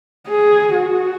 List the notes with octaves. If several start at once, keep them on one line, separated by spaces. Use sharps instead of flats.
G#4
F#4